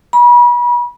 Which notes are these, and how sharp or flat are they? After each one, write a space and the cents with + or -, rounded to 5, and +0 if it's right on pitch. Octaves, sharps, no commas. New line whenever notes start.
B5 -35